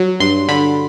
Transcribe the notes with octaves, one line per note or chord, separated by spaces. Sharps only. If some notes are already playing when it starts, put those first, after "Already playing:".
Already playing: F#3
G2 C6
D3 B5